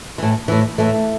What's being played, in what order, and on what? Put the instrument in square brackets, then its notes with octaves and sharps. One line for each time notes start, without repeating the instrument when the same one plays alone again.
[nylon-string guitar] A2 E3
A2 E3
A2 E3 A3